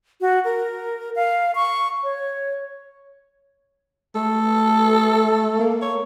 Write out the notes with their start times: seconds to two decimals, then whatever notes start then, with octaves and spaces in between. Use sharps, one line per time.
0.21 F#4
0.45 A#4
1.16 F5
1.55 C#6
2.04 C#5
4.15 A3 A4
5.59 A#3
5.82 C#5